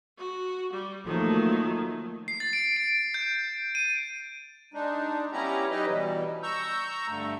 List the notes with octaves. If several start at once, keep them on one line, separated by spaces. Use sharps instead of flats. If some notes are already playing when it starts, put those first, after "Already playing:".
F#4
G3
D#3 F3 F#3 A3 A#3
C7
A6
D7
D7
G6
D#7
G#3 D4 D#4
G3 B3 C#4 E4 G4 A#5
F#3 D#4 G4 B4 D#5
B2 E3 G3
A#5 C#6 E6 G6
G2 D3 A3